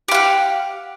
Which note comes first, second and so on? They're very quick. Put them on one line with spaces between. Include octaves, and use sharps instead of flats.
G4 F5 F#5